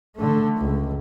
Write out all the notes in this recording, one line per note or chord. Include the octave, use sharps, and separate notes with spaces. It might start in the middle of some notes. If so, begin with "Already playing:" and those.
D3 A3
C#2